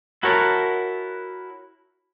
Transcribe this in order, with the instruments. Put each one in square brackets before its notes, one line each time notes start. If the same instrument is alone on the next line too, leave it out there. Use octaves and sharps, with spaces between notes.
[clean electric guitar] E4 F#4 A4 A#4 C#5